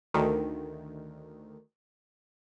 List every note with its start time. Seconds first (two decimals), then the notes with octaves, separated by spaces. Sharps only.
0.14 D2 D#3